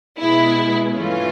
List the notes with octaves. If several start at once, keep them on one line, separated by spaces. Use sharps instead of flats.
B2 G#3 B3 E4
G2 E3 A3 C#4 F4